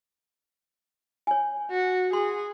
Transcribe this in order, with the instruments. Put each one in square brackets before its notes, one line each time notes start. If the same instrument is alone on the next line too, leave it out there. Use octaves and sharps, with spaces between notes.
[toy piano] C#5 G#5
[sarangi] F#4
[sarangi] G#4 [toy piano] C6